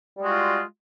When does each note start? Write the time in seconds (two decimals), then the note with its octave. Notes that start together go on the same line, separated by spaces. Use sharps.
0.17 G3
0.20 G#3
0.24 F#4
0.27 F4